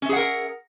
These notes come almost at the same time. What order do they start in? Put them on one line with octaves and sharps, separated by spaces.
C#4 E5 G#4 F#5 A#4